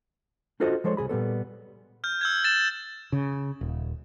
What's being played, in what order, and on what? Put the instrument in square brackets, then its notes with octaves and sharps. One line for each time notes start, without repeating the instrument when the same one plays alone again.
[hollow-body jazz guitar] D4 F4 F#4 A4 C5 D#5
F3 G#3 A4 C5 C#5
C2 F2 G#4 B5
A#2 G3 B3 A4
[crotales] F6 G6
E6 G6 G#6
A6 E7
[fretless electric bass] C#3
D#1